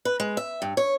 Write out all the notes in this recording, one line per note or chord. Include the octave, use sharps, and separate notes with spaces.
B4
G#3
E5
G2
C#5